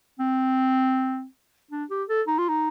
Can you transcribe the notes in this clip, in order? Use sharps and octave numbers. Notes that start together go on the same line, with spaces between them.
C4
D4
G4
A4
D#4
F4
D#4